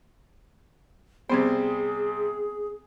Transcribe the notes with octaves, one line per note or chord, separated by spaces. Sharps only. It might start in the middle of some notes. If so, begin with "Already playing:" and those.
C3 G3 B3 C4 G#4 C5 G#6